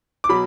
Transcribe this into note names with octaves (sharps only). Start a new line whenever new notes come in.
D6
B2 F#3 B5